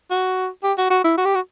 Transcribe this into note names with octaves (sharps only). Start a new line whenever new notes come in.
F#4
G4
F#4
F#4
E4
F#4
G4
F#4